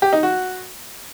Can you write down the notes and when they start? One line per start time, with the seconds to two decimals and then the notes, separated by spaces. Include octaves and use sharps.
0.02 G4
0.13 D#4
0.23 F#4